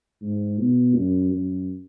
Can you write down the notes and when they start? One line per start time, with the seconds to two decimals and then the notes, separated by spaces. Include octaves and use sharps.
0.22 G#2
0.58 B2
0.95 F#2
1.31 F#2